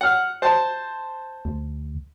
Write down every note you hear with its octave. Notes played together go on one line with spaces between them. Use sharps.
F#5 F6
C5 A5
D2